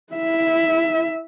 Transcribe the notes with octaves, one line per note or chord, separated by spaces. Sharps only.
E4 E5